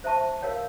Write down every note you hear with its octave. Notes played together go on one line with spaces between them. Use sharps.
C5 E5 A5 C#6
A#4 C#5 F5